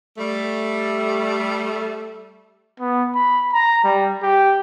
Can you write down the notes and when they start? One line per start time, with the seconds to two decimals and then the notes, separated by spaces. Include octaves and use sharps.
0.17 G3 A3
2.80 B3
3.15 B5
3.53 A#5
3.84 G3
4.23 G4